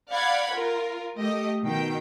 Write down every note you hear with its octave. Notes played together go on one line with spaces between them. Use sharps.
D5 F5 F#5 B5 F#6 G#6
F4 A#4
A3 G4 D#5
B2 D#3 G5